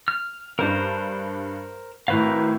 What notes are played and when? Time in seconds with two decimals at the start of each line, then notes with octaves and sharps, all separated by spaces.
0.08 F6
0.59 G2 D4 A#4 C5
2.08 G#1 A2 A#4 B4 F5